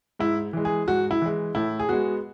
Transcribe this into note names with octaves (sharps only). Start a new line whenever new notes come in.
G#2 E4
E3 G#3
G#4
G#2 F#4
E4
E3 G#3
A2 E4
G#4
G#3 B3 F#4